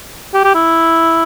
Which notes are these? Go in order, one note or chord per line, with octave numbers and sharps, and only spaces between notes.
G4
G4
E4